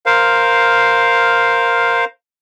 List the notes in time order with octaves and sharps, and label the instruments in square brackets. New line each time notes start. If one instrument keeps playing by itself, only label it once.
[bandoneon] A#4 C5 F5